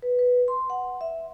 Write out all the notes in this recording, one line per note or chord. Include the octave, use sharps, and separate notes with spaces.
B4
B4
C6
F#5
E5